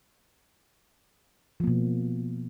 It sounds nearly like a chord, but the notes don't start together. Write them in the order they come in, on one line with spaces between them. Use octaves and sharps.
F3 A#3 B2